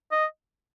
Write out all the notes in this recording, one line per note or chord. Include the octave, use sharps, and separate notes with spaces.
D#5